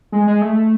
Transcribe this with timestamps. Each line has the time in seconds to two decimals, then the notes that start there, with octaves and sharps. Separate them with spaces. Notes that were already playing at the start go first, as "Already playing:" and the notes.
0.12 G#3
0.27 G#3
0.42 A3